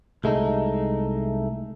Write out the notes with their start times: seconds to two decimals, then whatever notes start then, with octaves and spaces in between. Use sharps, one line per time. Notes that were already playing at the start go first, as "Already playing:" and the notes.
0.24 C2 G#3 A3 D#4